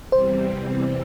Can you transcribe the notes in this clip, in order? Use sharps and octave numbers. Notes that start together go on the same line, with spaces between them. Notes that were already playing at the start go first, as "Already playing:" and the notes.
E2 C3 E3 G3 C4 C5